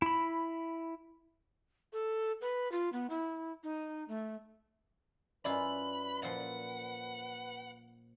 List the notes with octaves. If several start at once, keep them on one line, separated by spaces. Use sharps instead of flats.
E4 B5
A4
B4
F4
B3
E4
D#4
A3
F#2 E4 F4 B4 D5 B5
A#2 F3 F#5